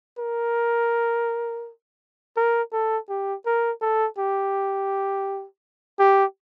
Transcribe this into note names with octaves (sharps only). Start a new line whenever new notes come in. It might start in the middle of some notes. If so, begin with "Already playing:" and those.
A#4
A#4
A4
G4
A#4
A4
G4
G4